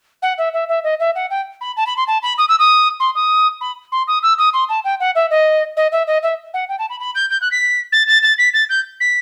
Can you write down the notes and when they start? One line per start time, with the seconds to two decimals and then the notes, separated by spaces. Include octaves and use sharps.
0.22 F#5
0.38 E5
0.53 E5
0.68 E5
0.84 D#5
1.00 E5
1.15 F#5
1.30 G5
1.61 B5
1.77 A5
1.86 B5
1.97 C6
2.07 A5
2.22 B5
2.38 D#6
2.48 E6
2.59 D#6
3.00 C6
3.15 D#6
3.61 B5
3.92 C6
4.07 D#6
4.23 E6
4.38 D#6
4.53 C6
4.69 A5
4.84 G5
5.00 F#5
5.15 E5
5.30 D#5
5.77 D#5
5.92 E5
6.07 D#5
6.23 E5
6.54 F#5
6.69 G5
6.79 A5
6.90 B5
7.00 B5
7.15 G6
7.30 G6
7.41 F#6
7.51 B6
7.92 A6
8.07 A6
8.23 A6
8.38 B6
8.53 A6
8.69 G6
9.00 B6